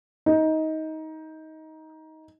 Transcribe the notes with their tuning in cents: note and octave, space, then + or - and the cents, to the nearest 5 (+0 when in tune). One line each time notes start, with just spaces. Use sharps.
D#4 +20